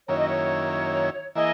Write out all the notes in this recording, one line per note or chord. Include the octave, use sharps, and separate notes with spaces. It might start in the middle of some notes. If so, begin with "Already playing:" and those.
F#2 D#3 A#3 C#4 E4 C#5
D#5
C#5
E3 A#3 E4 G#4 D#5